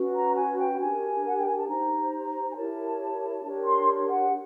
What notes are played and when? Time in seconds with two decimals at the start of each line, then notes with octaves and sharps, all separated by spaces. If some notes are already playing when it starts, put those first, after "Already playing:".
Already playing: C#4 F#4 B4
0.14 A#5
0.36 G#5
0.58 G5
0.80 D4 G4 A#4 G#5
1.27 F#5
1.37 G5
1.47 G#5
1.58 A5
1.68 D#4 G4 C5 A#5
2.50 G#5
2.56 E4 G4 A#4 C#5 A5
3.43 D4 G4 A#4 C#5
3.65 C6
4.10 F#5